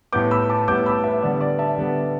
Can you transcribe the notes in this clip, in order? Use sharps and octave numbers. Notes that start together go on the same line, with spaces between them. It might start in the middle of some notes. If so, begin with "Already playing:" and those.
A2 G3 B3 D6 G6
B5 E6
A5 D6
A2 G3 B3 D6 G6
B5 E6
B4 E5
D3 G3 B3 D5
D5
E5 A5
D3 G3 B3